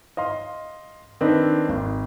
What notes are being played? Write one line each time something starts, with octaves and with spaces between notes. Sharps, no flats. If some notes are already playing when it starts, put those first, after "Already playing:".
D#5 F5 C6
D#3 C4 D4 B4 D#5
G#1